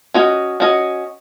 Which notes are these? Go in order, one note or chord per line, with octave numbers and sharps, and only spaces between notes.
C#4 F#4 D#5
C#4 F#4 D#5